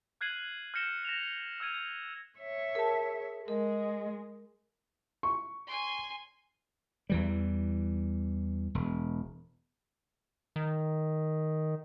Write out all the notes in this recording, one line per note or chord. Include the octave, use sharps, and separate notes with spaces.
F6 F#6 G#6 C7 D#7 F#7
F6 G6 A#6 C#7 E7 G7
A#6 E7 F7
E6 F6 G#6 D#7 F7
G#6
C#5 E5
G#4 A#4 A5
G#3 A#4 D#5
C#6
G#5 C6
E2 E3 G3
E1
D#3